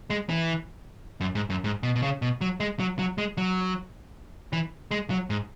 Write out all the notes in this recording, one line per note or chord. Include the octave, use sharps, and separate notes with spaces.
G#3
E3
F#2
G#2
F#2
G#2
B2
B2
C#3
B2
F#3
G#3
F#3
F#3
G#3
F#3
E3
G#3
F#3
G#2